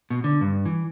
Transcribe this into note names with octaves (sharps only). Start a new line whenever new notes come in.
B2
D3
G2
E3